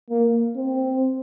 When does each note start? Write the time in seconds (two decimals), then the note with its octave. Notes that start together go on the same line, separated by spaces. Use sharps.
0.10 A#3
0.56 C4